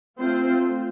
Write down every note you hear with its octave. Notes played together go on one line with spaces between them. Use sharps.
A3 C4 F4 C5